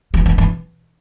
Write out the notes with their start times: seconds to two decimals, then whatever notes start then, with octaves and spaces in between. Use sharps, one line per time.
0.14 E3
0.26 E3
0.38 E3